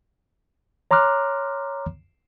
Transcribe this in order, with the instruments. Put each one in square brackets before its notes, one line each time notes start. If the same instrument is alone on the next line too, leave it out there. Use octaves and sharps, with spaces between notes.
[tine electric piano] C#5 A#5 C6 D6 F6 F#6